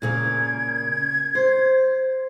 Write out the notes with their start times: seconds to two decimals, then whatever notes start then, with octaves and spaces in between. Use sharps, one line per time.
0.02 A#2 C#3 A#3 G#6
1.35 C5